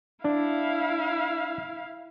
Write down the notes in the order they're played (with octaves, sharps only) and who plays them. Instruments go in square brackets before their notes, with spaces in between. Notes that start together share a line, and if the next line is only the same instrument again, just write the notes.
[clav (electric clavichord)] D4 [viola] E4 F5